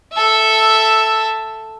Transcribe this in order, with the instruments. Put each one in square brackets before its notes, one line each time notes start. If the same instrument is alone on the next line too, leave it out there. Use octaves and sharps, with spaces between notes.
[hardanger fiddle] A4 E5